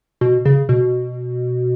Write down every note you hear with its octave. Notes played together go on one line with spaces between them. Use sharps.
B2
C#3
B2